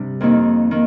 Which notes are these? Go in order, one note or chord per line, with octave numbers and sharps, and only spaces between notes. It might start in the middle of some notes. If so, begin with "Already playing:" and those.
Already playing: G2 C3 G3 D4
F2 D#3 A#3 D#4
D#3 A#3